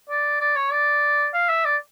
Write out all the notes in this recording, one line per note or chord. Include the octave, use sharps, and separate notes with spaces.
D5
D5
C#5
D5
F5
E5
D5